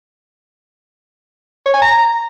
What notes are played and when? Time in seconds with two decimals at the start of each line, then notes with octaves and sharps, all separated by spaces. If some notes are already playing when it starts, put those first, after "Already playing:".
1.66 C#5
1.74 G#5
1.82 A#5